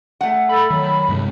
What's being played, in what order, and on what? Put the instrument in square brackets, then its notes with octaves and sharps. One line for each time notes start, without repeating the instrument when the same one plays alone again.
[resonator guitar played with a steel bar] A3 F#5
[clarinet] A4 [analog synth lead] B5
[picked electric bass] D#3 [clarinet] F#3
[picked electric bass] G2 C3 G#3